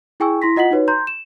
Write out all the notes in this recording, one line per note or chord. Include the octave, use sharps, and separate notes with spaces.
E4 G#4 G5 G#5 C#6 E6
E4 C6 A#6 B6
F4 D#5 F#5 B6 F#7
D#4 F#4 B4 C#5
A#5 C6 G6
E7